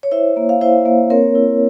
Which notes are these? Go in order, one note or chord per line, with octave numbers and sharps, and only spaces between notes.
C#5
E4 C5 E5
A#3
F5
E4 C5 E5
A#3
C4 A#4 C#5
E4